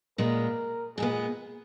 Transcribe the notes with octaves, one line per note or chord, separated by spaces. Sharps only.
A#2 G#3 B3 A#4
A#2 G#3 B3 G#4